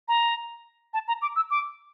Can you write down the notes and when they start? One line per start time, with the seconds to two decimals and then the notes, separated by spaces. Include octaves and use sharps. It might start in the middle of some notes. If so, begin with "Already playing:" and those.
0.08 A#5
0.94 A5
1.08 A#5
1.22 D6
1.36 E6
1.50 D6